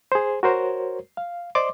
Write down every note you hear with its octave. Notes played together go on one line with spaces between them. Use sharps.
G#4 C5
F#4 A#4 C5 C#5
F5
C5 D5 D#5 C6 D6